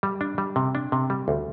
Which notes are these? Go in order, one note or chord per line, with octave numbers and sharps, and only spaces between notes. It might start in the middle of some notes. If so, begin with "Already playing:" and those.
G3
D4
G3
C3
D4
C3
G3
D2